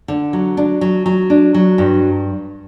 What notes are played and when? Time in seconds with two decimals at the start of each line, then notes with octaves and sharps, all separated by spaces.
0.08 D3
0.33 F#3
0.57 D4
0.81 F#3
1.06 F#3
1.30 D4
1.54 F#3
1.78 G2